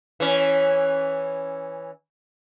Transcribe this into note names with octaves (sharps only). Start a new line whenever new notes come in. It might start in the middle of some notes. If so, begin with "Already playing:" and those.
E3 C#4